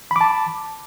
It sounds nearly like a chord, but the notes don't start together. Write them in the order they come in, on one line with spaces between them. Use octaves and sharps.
B5 D6 A5